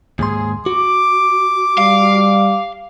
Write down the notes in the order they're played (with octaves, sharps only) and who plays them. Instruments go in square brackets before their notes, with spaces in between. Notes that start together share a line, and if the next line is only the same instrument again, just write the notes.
[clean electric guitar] D#2 G#2 C6 [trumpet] G#4
[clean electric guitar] F#4 [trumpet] D6
[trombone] G3 [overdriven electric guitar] F5